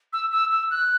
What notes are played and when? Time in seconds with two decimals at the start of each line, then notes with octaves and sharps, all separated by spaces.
0.13 E6
0.32 E6
0.52 E6
0.71 F#6